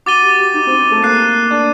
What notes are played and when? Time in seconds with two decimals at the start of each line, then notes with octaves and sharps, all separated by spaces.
0.06 F#4 D6 A6 D#7 G7
0.22 G4
0.38 G4
0.54 D#4
0.67 C4
0.91 A3
1.02 A#3 F#6 C7 D#7
1.51 D4